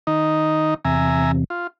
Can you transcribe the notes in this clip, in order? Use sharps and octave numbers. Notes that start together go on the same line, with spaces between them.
D#3 D#4
E2 C3 E5 G#5 A#5
F4